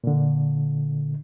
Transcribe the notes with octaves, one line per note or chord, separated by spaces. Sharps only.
A#2 D3